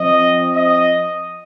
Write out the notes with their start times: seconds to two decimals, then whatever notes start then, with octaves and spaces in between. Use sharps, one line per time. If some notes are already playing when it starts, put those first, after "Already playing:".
Already playing: F3 C4 D#5
0.55 D#5